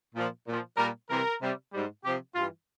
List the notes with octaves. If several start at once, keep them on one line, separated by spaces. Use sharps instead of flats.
A#2 F3
A#2 F3
A#2 G3 A#4
C3 E3 G3 A#4
C3 G3
G#2 G3
C3 F3 G4
G2 E3 G3 F4